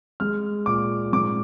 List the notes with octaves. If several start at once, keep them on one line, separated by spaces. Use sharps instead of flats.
G#3 F6
A#2 D6
G#2 D6